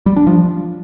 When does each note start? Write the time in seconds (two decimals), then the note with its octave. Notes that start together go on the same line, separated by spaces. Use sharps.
0.06 G3
0.16 D4
0.27 F3